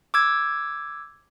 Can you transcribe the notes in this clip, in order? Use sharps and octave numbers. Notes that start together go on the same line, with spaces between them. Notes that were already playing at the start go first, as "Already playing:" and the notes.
D6 E6 G#6